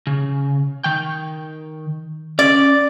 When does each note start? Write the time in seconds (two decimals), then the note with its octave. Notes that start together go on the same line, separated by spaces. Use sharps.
0.07 C#3
0.84 D#3 G5
2.39 C#4 D5